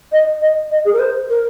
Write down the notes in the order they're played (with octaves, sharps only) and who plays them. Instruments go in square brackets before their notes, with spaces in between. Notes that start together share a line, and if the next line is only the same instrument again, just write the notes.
[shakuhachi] D#5
D#5
D#5
G#4
A#4
C5
A#4